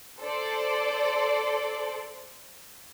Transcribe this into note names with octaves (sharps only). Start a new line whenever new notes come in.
A4 C5 D5